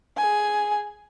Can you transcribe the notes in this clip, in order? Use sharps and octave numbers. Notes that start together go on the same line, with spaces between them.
G#4 G#5